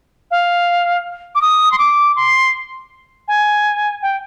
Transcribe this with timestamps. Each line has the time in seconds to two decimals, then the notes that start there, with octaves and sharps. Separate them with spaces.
0.31 F5
1.35 D6
1.41 D#6
1.72 C6
1.78 D6
2.16 C6
3.28 G#5
4.02 G5